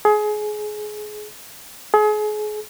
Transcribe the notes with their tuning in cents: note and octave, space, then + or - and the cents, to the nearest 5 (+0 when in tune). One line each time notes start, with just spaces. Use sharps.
G#4 +25
G#4 +35